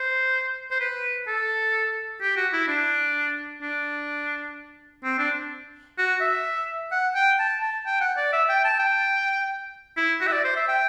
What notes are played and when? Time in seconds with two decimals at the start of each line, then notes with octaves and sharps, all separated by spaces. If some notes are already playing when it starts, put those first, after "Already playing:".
Already playing: C5
0.71 C5
0.80 B4
1.27 A4
2.21 G4
2.37 F#4
2.53 E4
2.68 D4
3.62 D4
5.04 C4
5.19 D4
5.98 F#4
6.21 E5
6.92 F#5
7.15 G5
7.39 A5
7.62 A5
7.86 G5
8.01 F#5
8.17 D5
8.33 E5
8.49 G5
8.65 A5
8.79 G5
9.97 E4
10.21 F#4
10.27 E5
10.32 D5
10.44 C5
10.56 E5
10.68 G5